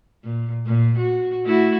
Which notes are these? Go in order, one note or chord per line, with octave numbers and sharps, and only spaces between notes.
A#2
A#2
F#4
A3 E4 F#4